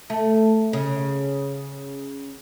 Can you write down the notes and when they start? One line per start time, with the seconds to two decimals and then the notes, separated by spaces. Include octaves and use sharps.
0.10 A3
0.73 C#3